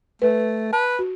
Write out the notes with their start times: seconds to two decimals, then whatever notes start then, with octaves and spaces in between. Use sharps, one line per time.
0.22 A3 B4
0.73 B4 A5
0.99 F#4